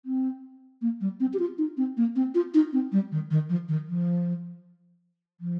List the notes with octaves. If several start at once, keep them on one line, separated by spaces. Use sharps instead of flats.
C4
A#3
G3
C4
G4
F4
D#4
C4
A#3
C4
F4
D#4
C4
G3
D#3
D#3
F3
D#3
F3
F3